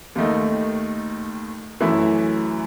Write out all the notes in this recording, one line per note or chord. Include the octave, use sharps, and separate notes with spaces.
D#2 D#3 A3 D#4
F#2 E3 A3 E4